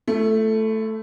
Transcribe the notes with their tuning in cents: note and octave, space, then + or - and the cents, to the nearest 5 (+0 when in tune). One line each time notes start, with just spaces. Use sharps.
A3 +0 E4 +45